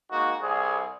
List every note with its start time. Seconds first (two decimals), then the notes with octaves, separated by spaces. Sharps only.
0.12 G#3 A#3 D#4 F#4
0.42 C2 G#4